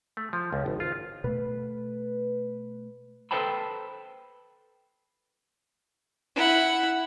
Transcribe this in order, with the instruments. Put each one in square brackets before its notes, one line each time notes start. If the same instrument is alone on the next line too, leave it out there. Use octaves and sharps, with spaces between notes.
[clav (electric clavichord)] A3
F3
C#2
G#1
F4
[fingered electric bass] B2 A3 [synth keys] B4
[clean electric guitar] A4 B4 C5 G5 A5 B5
[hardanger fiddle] E4 F#5